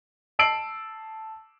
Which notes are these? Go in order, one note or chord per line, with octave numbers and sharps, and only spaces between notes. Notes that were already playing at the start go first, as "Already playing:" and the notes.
A5 E6 C7 D7 F#7